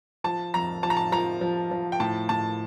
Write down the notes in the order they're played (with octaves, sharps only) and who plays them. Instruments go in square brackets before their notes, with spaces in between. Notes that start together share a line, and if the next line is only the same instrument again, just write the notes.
[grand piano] F3 [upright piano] A5
[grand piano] F2 [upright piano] A#5
[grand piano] F3 [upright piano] A5
[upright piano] A#5
A5
[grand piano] F3 [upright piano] A#5
[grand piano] F3
F3
[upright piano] G5
[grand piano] A2 [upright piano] A5
[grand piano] A2 [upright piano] A5